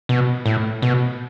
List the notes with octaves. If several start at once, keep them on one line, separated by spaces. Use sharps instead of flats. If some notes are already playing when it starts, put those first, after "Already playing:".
B2
A2
B2